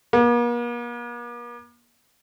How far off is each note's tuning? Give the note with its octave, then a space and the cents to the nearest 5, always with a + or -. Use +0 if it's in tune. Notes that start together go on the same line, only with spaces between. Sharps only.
A#3 +45